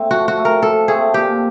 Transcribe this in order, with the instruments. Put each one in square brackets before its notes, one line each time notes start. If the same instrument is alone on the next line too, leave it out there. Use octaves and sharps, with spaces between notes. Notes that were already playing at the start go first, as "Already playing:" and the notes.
Already playing: [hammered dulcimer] A3 C4
[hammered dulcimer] F3 [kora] F#4
[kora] F#4
[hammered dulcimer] A3 C4
[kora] A#4
[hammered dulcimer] F3 [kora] A4
[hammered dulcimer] A3 C4 [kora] G#4
[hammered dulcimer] A#2 [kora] G4